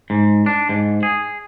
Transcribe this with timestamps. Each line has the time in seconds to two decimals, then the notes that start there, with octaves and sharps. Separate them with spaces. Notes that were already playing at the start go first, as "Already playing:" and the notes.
0.10 G#2
0.46 D4
0.69 G#2
1.03 G#4